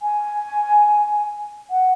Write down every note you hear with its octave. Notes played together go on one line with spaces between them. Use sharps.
G#5
F#5